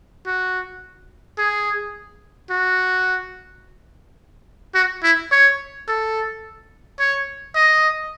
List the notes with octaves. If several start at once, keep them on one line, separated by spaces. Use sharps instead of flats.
F#4
G#4
F#4
F#4
E4
C#5
A4
C#5
D#5